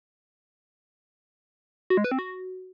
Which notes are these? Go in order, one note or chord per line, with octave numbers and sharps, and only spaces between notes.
F#4
G#3
B4
C4
F#4